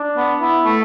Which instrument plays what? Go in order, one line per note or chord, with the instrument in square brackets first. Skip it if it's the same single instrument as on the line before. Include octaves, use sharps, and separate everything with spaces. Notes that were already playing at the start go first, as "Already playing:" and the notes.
Already playing: [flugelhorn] D4
[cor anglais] B3
[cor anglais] B3 [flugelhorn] E4
[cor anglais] A3